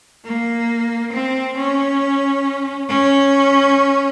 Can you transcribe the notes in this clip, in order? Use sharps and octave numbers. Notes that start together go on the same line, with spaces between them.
A#3
C4
C#4
C#4